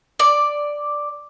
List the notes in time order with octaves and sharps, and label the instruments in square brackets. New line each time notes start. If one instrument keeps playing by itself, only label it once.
[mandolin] D5